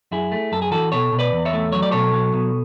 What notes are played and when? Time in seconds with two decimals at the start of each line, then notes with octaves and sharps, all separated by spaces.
0.12 F#2 E4 G#4
0.32 A3
0.52 F#2 A4
0.62 G#4
0.72 E3 F#4 A4
0.92 B2 A4 C#5
1.13 B2
1.19 B4 D5
1.32 E2
1.45 C#5 E5
1.53 A3
1.72 F#3 C#5
1.82 D5
1.91 B2 A4 C#5
2.14 F#3
2.34 B2